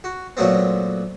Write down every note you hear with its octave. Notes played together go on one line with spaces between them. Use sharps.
F#4
A#2 F#3 A3 B3 C4